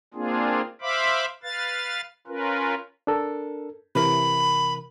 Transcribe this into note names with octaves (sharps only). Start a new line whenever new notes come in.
A#3 C4 D4 F4 G#4
C5 E5 F5 B5 D6
B4 F5 A6
C#4 F4 A#4 B4
D4 A4 A#4
C3 E3 A#4 B5